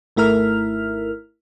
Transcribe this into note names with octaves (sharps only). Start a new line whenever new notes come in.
G#1 A3 E4 A#4 F6